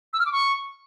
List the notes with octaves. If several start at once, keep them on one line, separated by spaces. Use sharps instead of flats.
E6
F6
D6
C#6